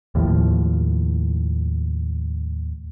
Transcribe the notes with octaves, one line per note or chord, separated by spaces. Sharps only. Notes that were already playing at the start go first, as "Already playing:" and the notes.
D#2 A2 F3